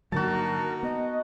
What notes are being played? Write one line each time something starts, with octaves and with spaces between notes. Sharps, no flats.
G2 D3 F#3 A#3 D#4 F#4 A#4 A5
B3 D#5